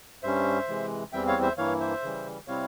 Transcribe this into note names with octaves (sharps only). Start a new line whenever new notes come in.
G2 G3 C#4 C5 E5
C3 E3 G#3
E2 E3 G3 C4 E5 G5
C#5 F5
C5 E5
G2 E3 A#3 E4 C#5 F5
C5 E5
C#3 E3 G3
C3 G3 C4 E4 C#5 F5